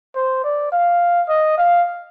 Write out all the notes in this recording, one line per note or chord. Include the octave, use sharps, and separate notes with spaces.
C5
D5
F5
D#5
F5